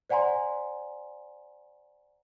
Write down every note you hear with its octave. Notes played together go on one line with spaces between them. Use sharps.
C5 D5 F#5 G#5 A#5 C6